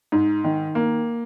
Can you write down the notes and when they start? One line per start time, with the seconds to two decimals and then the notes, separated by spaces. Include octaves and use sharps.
0.12 G#2
0.44 D#3
0.75 A#3